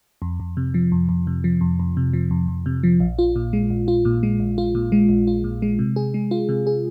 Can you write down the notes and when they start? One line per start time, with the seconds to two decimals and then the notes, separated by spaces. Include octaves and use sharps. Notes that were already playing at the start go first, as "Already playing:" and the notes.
0.22 F2
0.40 F2
0.57 C3
0.74 F3
0.92 F2
1.09 F2
1.27 C3
1.44 F3
1.61 F2
1.80 F2
1.97 C3
2.13 F3
2.31 F2
2.48 F2
2.66 C3
2.83 F3
3.00 A#1
3.19 F4
3.36 A#2
3.53 G#3
3.70 A#1
3.88 F4
4.05 A#2
4.23 G#3
4.40 A#1
4.58 F4
4.75 A#2
4.92 G#3
5.09 A#1
5.27 F4
5.44 A#2
5.62 G#3
5.79 C3
5.96 G#4
6.14 G#3
6.31 F4
6.49 C3
6.67 G#4